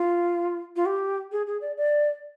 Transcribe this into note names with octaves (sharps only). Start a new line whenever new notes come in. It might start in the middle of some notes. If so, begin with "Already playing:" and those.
Already playing: F4
F4
G4
G#4
G#4
D5
D5